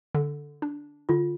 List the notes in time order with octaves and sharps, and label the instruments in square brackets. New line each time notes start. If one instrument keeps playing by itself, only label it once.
[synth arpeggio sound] D3
D4
[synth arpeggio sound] D3 [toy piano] F4